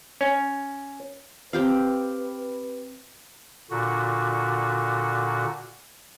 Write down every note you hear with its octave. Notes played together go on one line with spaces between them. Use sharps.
C#4
C4 G4 B4 F5
A#2 D3 F#4